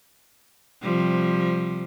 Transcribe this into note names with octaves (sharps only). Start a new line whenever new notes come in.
C3 F3 G3